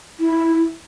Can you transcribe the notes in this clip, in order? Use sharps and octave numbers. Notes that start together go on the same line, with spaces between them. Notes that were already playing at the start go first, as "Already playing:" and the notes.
E4